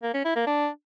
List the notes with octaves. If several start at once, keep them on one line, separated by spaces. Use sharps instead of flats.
A#3
C#4
E4
A#3
D4